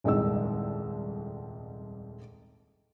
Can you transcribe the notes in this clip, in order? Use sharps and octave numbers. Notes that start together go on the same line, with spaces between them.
D#1 C2 F2 G#2 D#3 E6